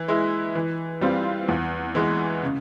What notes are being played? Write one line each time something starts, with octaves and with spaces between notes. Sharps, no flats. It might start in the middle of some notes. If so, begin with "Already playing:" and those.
Already playing: E3
G#3 E4
E3
G3 C4 F4
E2
E3 G#3
C#3